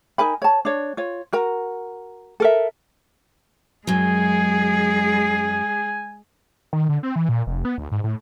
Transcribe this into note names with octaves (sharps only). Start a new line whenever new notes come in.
D#4 A#4 G#5 B5
C#5 A5
D4 C#5
F4 C#5
F#4 A#4 A#5
A4 A#4 E5
F#2 F#3 G#3 G#4 G#5
D#3
D3
C4
E3
A#2
F1
B3
D2
G#2
A2